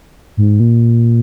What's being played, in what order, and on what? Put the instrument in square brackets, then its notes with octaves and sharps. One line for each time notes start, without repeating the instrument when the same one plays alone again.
[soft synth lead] G#2
A#2